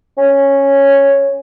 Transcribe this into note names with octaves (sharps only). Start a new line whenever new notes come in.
C#4